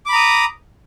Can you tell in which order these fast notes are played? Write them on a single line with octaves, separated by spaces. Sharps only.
D6 B5 A#5 D#6